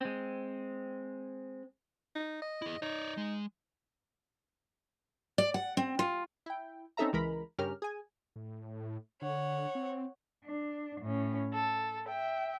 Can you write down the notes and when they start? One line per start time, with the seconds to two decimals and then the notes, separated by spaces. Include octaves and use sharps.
0.01 G#3 C4
2.15 D#4
2.42 D#5
2.62 E4 G#4
2.82 D#4 C#5 D5
3.17 G#3
5.38 D5
5.54 F#5
5.77 C4
5.99 F4
6.46 E4 G5
6.97 C4 C#4 D#4 A4 E5 A#5
7.13 C#2 E3 G#3 A#4 A#5 B5
7.58 G2 C#3 C#4 G4 A#4 F6
7.82 G#4 G#5
8.36 A2
9.22 D3 C#5 F#5
9.75 C4
10.45 D4
11.02 A2 C#4
11.53 A4
12.08 E5 G5